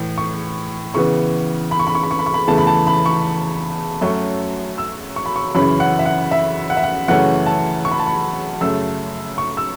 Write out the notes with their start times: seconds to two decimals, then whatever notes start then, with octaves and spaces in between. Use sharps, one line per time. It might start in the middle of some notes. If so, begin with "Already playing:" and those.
Already playing: A2 E3
0.18 C#6
0.94 C#3 E3 B3 C#6
1.71 B5
1.80 C#6
1.87 B5
1.95 C#6
2.03 B5
2.11 C#6
2.19 B5
2.26 C#6
2.34 B5
2.48 E2 C#3 E3 A3 A5
2.58 B5
2.67 A5
2.87 B5
3.06 C#6
4.01 F#2 F#3 A3 C#4
4.78 E6
5.16 C#6
5.26 B5
5.36 C#6
5.55 F#2 C#3 E3 C#4 B5
5.80 F#5
5.99 E5
6.06 F#5
6.31 E5
6.70 F#5
6.77 E5
6.84 F#5
7.08 F#2 C#3 E3 A3 C#4 F#5
7.46 A5
7.85 C#6
7.91 B5
7.99 A5
8.06 B5
8.61 F#2 C#3 A3 E6
9.38 C#6
9.57 E6